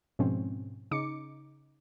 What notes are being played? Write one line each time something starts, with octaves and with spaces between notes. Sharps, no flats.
G#2 B2 F3 C4 C#4
C#3 D#4 D6 C#7